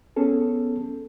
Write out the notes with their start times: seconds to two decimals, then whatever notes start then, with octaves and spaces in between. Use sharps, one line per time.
0.16 B3 C#4 G#4 A4